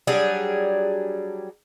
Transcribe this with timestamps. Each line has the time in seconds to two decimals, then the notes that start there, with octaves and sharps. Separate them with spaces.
0.07 F#3 G3 D4 G#4